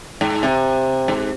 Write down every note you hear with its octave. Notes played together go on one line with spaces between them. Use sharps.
G#2
C3
G#2